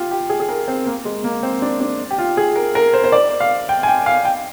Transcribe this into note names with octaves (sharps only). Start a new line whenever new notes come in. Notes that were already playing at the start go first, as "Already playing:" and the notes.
Already playing: F4 G4
G4
G#4
G#4
A#4
C4
A#3
G#3
A#3
C4
D4
D4
G4
F4
G#4
A#4
A#4
C5
C5
D5
F5
G5
G#5
G5
F5
G5